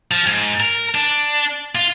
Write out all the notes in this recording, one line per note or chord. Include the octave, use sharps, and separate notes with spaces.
F3
G#2
A#4
D4
F4